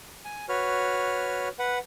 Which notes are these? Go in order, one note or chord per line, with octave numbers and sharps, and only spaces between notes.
G#5
F#4 B4 C#5 F6
B4 F#5